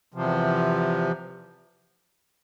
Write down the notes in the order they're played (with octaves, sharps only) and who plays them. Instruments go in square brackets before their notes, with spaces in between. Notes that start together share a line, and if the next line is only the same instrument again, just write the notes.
[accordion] E2 C3 F3